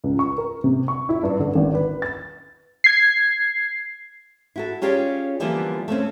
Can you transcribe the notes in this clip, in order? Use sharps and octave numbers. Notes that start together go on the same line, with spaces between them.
C#2
C#6
A#4
C3
C#6
E4
G2
D3
G#1
B4
A6
G#6 C7
E4 F#4 A4
C#4 F4 G4 G#4 C#5 D5
D3 E3 F3 G3 A#3 B3
A3 A#3 C4 C#4